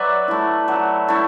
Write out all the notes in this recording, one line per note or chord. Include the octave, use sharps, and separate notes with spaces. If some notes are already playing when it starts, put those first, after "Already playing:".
Already playing: F#3 B4 D5 E5
A3 E4
F#3
A3 E4